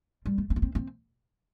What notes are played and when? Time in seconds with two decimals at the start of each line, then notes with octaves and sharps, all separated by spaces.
0.26 G3
0.38 A3
0.50 C4
0.56 B3
0.62 C4
0.75 C4